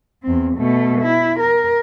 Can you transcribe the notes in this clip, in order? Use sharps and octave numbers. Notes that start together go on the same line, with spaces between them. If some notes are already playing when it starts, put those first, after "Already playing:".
E2 C4
B2 A3
E4
A#4